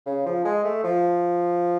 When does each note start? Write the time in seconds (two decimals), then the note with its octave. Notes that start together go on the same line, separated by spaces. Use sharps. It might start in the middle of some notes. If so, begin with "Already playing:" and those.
0.06 C#3
0.25 F3
0.44 G#3
0.64 A3
0.84 F3